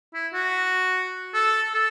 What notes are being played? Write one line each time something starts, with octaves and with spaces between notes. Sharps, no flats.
E4
F#4
A4
A4